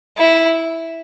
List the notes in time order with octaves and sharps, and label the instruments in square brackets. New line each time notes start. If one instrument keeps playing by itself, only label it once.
[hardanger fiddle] E4